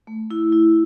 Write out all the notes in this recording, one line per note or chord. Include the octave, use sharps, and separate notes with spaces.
A3
E4
E4